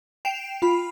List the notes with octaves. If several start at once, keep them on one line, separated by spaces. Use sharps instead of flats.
G5 C7 D7 E7 F7
F4 B5